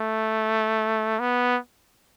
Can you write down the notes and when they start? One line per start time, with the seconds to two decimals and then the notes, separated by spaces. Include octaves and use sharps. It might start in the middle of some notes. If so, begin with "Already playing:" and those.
Already playing: A3
1.19 B3